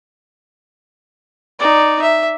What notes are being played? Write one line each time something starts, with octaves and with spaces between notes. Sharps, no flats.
D#4 D5
E5